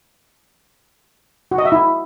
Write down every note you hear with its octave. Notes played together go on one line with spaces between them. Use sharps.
F#4
D#5
E5
E4